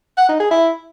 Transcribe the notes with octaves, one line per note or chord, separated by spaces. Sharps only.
F#5
D#4
G#4
E4